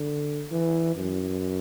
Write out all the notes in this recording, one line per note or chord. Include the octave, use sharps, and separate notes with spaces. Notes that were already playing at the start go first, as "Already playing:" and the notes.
Already playing: D3
E3
F#2